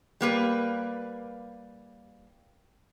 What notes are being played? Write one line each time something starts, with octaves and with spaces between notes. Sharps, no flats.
G3 A#3 B4